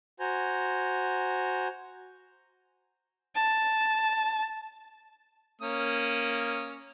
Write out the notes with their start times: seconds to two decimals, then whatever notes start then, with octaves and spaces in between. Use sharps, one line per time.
0.20 F#4 C5 G#5 A#5
3.35 A5
5.61 A#3 C#4 D#6